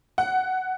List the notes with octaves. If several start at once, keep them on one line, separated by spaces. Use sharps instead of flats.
F#5